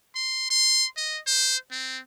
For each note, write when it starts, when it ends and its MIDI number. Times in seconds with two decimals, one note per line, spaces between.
0.15 0.50 84
0.50 0.87 84
0.97 1.19 75
1.27 1.57 72
1.71 1.99 60